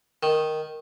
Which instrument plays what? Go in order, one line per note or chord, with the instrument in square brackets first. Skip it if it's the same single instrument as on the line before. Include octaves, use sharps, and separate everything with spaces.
[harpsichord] D#3